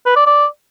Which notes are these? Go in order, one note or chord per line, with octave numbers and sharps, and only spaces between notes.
B4
D5
D5